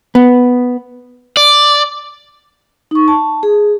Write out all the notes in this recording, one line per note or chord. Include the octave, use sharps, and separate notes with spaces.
B3
D5
D#4 C#6
A5
G#4